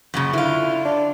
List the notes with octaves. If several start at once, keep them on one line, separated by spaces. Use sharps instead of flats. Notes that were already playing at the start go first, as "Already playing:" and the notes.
F#2 A#2 C#3
D3 E4 F4
D4